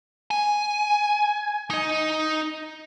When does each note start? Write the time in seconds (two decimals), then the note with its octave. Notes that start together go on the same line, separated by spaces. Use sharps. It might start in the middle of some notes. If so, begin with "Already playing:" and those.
0.31 G#5
1.70 D#4 D#5